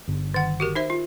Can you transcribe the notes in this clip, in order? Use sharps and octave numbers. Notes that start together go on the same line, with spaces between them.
G1
D#3 F#5
F#4 G4 A#4
D#4 C5 E5
F4